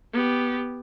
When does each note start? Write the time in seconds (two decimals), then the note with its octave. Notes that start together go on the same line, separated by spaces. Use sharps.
0.13 B3 G4